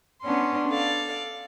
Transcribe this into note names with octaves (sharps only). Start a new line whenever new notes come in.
B3 C#4 D4 C6
A4 D5 F5